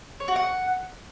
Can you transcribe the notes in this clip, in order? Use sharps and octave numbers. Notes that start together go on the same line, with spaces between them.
C#5
F#4
F#5